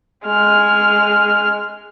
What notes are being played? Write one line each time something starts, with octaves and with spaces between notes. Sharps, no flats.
G#3 F6